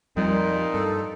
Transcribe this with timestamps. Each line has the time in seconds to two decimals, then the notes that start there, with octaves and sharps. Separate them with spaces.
0.17 F2 A#2 G3 D#4
0.74 G2 A4